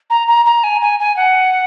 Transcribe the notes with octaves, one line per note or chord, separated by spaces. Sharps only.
A#5
A#5
A#5
G#5
G#5
G#5
F#5